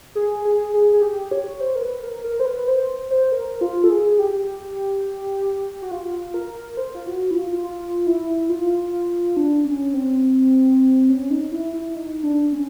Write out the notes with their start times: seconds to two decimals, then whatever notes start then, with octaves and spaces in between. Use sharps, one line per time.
0.15 G#4
0.45 G#4
0.74 G#4
0.93 G#4
1.02 G4
1.31 C#5
1.60 C5
1.76 A#4
1.82 B4
2.03 A#4
2.24 A#4
2.40 C5
2.45 B4
2.68 C5
3.11 C5
3.32 A#4
3.61 F4
3.84 A4
3.90 G#4
4.19 G4
5.82 F#4
5.91 F4
6.34 A#4
6.77 C5
6.95 F4
7.06 F#4
7.31 E4
7.35 F4
7.63 F4
8.07 E4
8.49 F4
9.37 D4
9.65 C#4
9.94 C4
11.09 C#4
11.30 D#4
11.52 E4
11.73 E4
11.95 D#4
12.23 D4
12.53 C#4